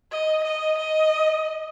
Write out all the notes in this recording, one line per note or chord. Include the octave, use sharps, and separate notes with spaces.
D#5
D#5
D#5